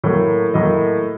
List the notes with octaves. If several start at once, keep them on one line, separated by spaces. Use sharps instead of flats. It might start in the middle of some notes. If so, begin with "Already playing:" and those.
A2 F#3 A#3 C#5
A2 F#3 A#3 D#5